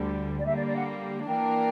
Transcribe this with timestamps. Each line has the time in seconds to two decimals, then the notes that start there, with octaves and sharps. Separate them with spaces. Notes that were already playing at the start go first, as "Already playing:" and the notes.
Already playing: D2 D3 G3
0.39 D5
0.46 D3 G3 A#3 E5
0.56 D5
0.67 D5
0.76 F#5
1.27 E3 A#3 D4 A#4 G5